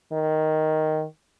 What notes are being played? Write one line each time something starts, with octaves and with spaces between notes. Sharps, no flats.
D#3